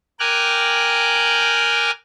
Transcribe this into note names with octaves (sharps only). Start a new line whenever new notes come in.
A#4 G5 G#5 D6 F6 F#6